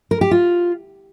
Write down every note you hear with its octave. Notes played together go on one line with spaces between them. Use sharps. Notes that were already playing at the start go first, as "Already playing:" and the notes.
A#4
G4
F4